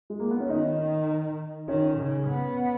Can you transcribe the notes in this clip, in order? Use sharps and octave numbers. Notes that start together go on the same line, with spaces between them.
G#3
A#3
B3
C#4
D#3 D#4
D#3 C#4
C#3
B3